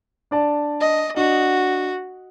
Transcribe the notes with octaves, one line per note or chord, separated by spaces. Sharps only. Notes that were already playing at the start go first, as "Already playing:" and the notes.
D4 D5 A5
D#5
D4 F#4 D#5